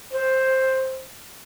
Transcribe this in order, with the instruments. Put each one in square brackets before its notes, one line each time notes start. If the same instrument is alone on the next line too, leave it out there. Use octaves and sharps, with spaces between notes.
[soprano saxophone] C5